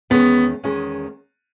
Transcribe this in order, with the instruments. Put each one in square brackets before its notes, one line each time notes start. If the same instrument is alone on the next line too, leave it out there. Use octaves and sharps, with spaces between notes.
[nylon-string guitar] E2 D#3 G#3 C#4 G#4 [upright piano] B3
[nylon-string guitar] E2 D#3 G#3 C#4 G#4